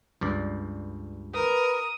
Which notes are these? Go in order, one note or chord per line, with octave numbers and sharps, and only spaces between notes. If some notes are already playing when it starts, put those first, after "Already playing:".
C#2 G2 D5
A#4 B4 D#6